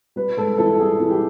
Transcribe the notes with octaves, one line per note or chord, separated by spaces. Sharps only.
G3 B4
G#2 A4
E3 A4
G3 G#4
E3
G4